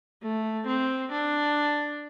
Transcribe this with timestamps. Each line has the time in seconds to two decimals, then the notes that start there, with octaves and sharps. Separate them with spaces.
0.22 A3
0.67 C4
1.12 D4